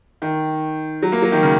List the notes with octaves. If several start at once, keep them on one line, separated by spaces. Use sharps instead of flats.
D#3
F#3
A#3
F#3
D#3
C#3